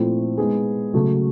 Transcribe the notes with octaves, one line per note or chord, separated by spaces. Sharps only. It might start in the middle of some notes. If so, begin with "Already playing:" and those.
Already playing: A#2 F3 A3 C4 E4
G#3 B3 D#4 G#4
C#3 F#3 A3